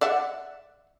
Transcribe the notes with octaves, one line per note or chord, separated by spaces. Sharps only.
D5 E5 F#5